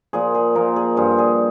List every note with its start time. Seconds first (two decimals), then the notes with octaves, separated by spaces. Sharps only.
0.13 A#2 F3 G#4
0.35 G#4
0.55 A#2 F3 A#4
0.76 G#4
0.97 G2 F3 G#4
1.18 G#4